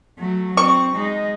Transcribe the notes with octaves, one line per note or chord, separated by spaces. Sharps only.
F#3 A3
C4 C#6
G#3 D#4